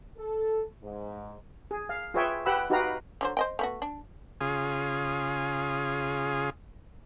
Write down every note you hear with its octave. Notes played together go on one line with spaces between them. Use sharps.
A4
G#2
G#4
F5
F4 G#4 B4 C#5 E5 G5
G4 B4 F#5 G5 B5 E6
D#4 F#4 G4 B4 F5 A#5
D3 F#3 C5
C5 D#5 G5
A3 B3 F#4
D4
C#3 F4 G#4